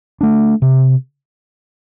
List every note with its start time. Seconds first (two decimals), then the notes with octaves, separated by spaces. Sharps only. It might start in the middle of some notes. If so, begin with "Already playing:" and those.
0.21 A3 D4
0.62 C3